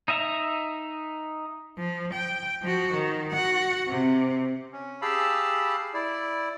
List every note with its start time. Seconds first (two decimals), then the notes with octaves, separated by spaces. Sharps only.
0.08 D#4 D#5 E5 A#5
1.77 F3
2.13 G5
2.62 F3 F#4
2.94 D#3
3.31 F#4 F#5
3.88 C3
4.73 C#4
5.02 G4 G#4 F5 A5 B5 E6
5.94 E4 D5